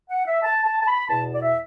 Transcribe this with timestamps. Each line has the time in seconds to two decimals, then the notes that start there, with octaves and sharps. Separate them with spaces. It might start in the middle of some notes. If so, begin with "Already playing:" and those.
0.10 F#5
0.27 E5
0.42 A5
0.65 A5
0.81 A5
0.87 B5
1.09 E2 B2 B3 A5
1.33 D5
1.42 E5